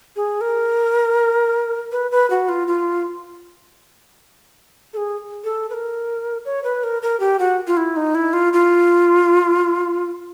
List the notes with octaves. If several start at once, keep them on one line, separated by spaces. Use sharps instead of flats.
G#4
A#4
B4
B4
F#4
F4
F4
A4
G#4
A4
B4
A#4
C#5
B4
A#4
A#4
G4
F#4
F4
E4
D#4
E4
F4
F4